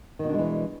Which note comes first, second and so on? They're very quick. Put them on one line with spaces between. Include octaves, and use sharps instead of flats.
D#3 B2 D4 G#3 E3